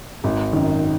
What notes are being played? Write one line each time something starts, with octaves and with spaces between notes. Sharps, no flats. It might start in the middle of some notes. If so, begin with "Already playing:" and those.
G#1
F#2 D#3